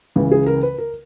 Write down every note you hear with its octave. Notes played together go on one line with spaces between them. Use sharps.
C#2 C#3 E3
G#4
A#4
B4
A#4